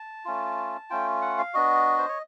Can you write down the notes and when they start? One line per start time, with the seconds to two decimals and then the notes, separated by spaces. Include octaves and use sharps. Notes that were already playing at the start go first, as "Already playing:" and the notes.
Already playing: A5
0.25 A3 C#4 F4
0.90 A3 C#4 F4 G5
1.22 F#5
1.38 F5
1.54 B3 D4 F#4 D#5
1.98 C5
2.08 C#5